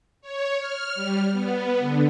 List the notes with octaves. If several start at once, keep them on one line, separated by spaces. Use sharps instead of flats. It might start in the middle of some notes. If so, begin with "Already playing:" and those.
C#5
F6
G3
B3
D3